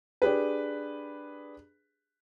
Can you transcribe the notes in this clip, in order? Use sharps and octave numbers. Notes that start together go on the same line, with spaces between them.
D4 G4 G#4 B4